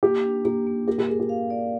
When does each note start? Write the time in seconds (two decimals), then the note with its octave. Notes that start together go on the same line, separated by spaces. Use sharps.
0.03 A#3 G4
0.24 D4
0.45 A#3 G4
0.67 A#3
0.88 G4 A#4
0.98 G4
1.08 G#4 A#4
1.20 G4
1.29 F5
1.50 D5